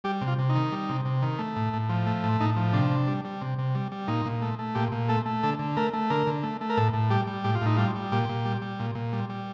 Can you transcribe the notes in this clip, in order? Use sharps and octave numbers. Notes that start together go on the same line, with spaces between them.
G3 G4
C3
F4
C3
D#4
D#3
G3
C3
C3
D#3
A3
A2
A2
F3
A3
A2
A2 D#4
F3
C3 D4
C3
G3
G3
C3
C3
G3
G3
A#2 D#4
A#2
A3
A3
A#2 G4
A#2
A3 A4
A3
D3 A4
D3
A3 A#4
A3
D3 A#4
D3
A3
A3
A#4
A2 A4
A2
G3 G4
G3
A2 G4
F4
A2 D#4
G3 F4
G3
A#2 G4
A#2
G3
G3
A#2
A#2
G3
G3